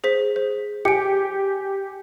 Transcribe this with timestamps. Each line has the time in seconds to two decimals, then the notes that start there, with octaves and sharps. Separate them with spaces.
0.04 G#4 C5 B6
0.36 C5
0.85 G4 G#5 C#7 D7